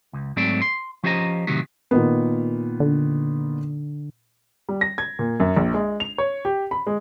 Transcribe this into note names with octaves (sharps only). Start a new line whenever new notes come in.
C#2
G#2 F#3 A3 C4 D5
C6
F3 C#4 G4 C5 D#5 A#5
A2 C3 D#3 F#3 C4 G4
A#2 D#3 B3
D3
G3
A#6
G#6
A#2
F#2
A#1
G#3
F7
C#5
G4
B5
G#3